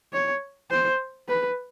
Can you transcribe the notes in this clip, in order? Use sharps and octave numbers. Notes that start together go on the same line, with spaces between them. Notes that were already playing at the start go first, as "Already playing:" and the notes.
C#5
C5
B4